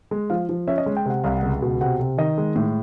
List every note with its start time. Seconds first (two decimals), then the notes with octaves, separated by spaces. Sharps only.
0.11 G#3
0.30 F3 F5
0.49 F3
0.68 C#4 E5
0.78 D#5
0.86 G#3
0.96 G5
1.06 C3 F#5
1.24 C2 F5
1.37 F#5
1.43 C#2
1.62 B2
1.81 C3 F#5
2.00 C3
2.18 D#3 D#5
2.38 G#3
2.56 A2